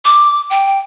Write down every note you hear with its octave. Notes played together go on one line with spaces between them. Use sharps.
D6
G5